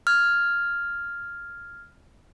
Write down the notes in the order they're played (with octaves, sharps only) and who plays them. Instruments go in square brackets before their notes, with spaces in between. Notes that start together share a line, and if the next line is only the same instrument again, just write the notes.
[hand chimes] F6 G#6